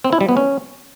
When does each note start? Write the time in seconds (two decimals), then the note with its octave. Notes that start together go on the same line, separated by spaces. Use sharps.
0.04 C4
0.13 E4
0.21 G3
0.29 B3
0.37 C#4